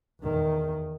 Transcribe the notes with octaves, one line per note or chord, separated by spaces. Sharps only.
E2 D#3